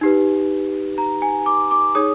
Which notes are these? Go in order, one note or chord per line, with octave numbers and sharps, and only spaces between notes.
D#4 G4 B4
A#5
G#5
D6
D6
D#4 G#4 C#5 D#6